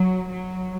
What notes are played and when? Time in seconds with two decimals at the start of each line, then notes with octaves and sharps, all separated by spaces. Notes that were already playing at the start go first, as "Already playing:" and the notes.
Already playing: F#3
0.29 F#3